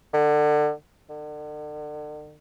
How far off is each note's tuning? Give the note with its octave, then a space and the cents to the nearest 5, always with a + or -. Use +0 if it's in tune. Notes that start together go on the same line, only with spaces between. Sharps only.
D3 +30
D3 +40